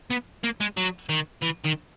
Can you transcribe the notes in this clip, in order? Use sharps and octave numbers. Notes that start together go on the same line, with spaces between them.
B3
A#3
G#3
F#3
D#3
E3
D#3